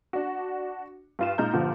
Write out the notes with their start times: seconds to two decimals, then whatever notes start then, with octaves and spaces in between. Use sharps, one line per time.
0.13 D4 F#4
1.19 G2 F4 E7
1.38 A#2 G#3 D#4 A#5 F6 G6
1.53 G2 A#2 D3 F3